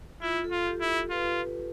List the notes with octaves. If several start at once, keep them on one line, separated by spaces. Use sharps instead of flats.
E4 F4
A4
F4
G4
E4
F4 B4